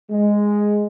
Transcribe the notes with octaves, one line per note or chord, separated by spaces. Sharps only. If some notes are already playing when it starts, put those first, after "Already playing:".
G#3